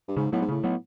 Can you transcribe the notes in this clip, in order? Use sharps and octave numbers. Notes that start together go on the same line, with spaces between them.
G2
G#2 C#3
A2 F#3 B3
G#2
A2 C#3
F#3 B3